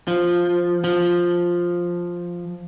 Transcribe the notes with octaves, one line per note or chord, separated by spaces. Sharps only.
F3
F3